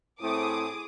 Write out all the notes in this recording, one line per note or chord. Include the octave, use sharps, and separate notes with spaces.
A2 A3 C4 E4 G#4 D6 D#6